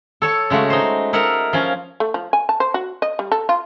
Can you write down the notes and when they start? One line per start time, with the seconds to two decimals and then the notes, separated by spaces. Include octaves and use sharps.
0.22 A4 C#5 A5
0.50 C#3 G#3 A3 F#4
0.70 D#4 C5
1.13 D#4 E4 A#4 F#5 A5
1.53 F3 C#4 G#5 A#5
2.00 A3
2.14 F3
2.33 G#5
2.49 A5
2.60 C5
2.74 F#4
3.02 D#5
3.19 G3
3.32 A4
3.49 F4